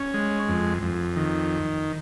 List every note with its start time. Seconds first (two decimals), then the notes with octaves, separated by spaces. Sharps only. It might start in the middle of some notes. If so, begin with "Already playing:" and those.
Already playing: C#4
0.14 G#3
0.49 F2
0.83 F2
1.17 D#3